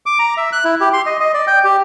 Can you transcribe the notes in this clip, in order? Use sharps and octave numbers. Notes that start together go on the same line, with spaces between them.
D6
A#5
E5
F#6
E4
G4
C6
D#5
D#5
D5
G5
G4